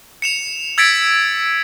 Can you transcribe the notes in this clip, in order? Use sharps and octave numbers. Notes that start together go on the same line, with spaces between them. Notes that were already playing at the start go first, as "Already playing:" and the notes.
C#7 E7 F7
E6 G#6 A6 B6 C#7 D7